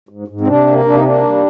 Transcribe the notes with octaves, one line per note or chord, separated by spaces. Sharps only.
G#2
G#2
C4
C3 D4
A#3
C3 D4
D#4
A#3 D4
G3